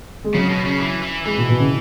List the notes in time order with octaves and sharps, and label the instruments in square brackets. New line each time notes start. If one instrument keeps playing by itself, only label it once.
[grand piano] G#3
[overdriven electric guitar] C#3 [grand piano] F#3
[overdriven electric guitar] B2
C#3
E3
E3
[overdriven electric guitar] E3 [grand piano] G#3
[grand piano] B2
B2
C#3